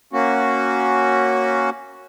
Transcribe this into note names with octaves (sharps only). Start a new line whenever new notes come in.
A#3 C#4 F#4